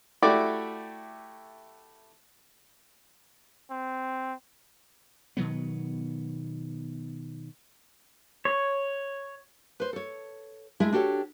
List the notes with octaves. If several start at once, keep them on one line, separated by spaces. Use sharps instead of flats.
A3 E4 F#4 G4 D5 D6
C4
B2 D#3 F#3 B3
C#5
B4 C5
A4 C#5
G#3 A3 E4 G#4 E5
D4 F#4 G4 A4 C#5